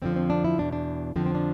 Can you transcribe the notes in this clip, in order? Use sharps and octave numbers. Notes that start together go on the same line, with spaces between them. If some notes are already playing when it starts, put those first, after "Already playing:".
F2 D3 F3 C4
C4
D4
E4
E2 B2 D4
D4
F2 D3 F3 C4
C4
D4